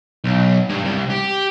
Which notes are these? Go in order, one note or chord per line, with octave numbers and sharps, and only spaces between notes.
B1
G2
C2
G4